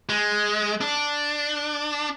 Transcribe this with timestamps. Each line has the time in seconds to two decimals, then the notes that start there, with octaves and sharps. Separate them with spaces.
0.09 G#3
0.81 D4